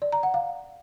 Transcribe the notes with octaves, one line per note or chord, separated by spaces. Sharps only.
D5
A#5
F#5
F5